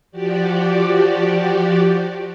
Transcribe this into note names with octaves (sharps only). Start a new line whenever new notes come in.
F3 F#4 G4 D5